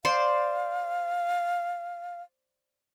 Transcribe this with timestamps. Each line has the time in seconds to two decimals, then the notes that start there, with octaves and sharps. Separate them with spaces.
0.05 C5 D5 F5 C6